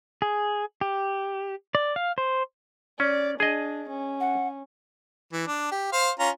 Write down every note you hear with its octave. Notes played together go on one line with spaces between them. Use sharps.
G#4
G4
D5
F5
C5
C#4 D5
D4 G#4 D#5
C#4
F#5
E3
D4
G4
C5 F5
C#4 F4 A#5